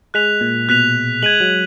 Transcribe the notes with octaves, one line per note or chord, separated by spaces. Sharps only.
G#3 F#6 B6 F7
A#2
B2 F#6 B6 F7
G#3 G#6 D#7 F#7
F#3